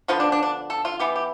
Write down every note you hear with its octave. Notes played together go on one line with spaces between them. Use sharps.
D3 F3 B3 F4
D4
D4
D4
A4
F4
E3 B3 G4
G4